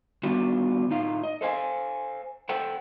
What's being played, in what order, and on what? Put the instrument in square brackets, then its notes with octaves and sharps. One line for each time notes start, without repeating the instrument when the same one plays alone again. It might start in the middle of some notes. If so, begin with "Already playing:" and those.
[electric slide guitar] D#3 G3 B3 D4 F4 F#4
A2 D#4 F4 F5
D#5
A4 C5 F5 G#5
A4 C5 F#5 G5